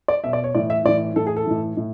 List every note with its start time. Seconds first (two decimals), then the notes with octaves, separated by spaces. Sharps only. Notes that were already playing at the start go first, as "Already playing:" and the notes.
0.08 D5
0.24 B2 E5
0.33 D5
0.44 C#5
0.55 A2 E3 D5
0.70 E5
0.85 A2 E3 D5
1.16 A2 E3 A4
1.27 G#4
1.37 A4
1.47 A2 E3
1.77 A2